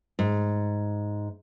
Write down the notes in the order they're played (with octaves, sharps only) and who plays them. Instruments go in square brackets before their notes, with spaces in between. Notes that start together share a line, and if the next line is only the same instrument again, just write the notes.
[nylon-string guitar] G#2